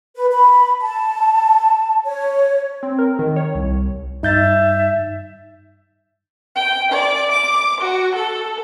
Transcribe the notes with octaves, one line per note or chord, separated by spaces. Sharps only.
B4
B5
A5
C#5
C4
A#4
D#3
C#5
C2
G2 D#4 E5 G6 A6
G5
D5
D6
F#4
A4